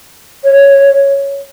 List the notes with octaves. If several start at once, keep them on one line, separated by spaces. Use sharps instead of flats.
C#5